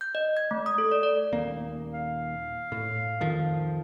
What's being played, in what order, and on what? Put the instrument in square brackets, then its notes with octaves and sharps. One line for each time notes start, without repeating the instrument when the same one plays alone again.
[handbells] G6
D#5
G#6
A3
D#6
A4
D5
D5
[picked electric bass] D#1 A#3
[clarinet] F5
[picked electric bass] A2
F2 D#3 F3